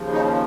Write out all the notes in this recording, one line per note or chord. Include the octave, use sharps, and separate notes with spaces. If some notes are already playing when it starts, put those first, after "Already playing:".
Already playing: D#2 C#3 F3
D#4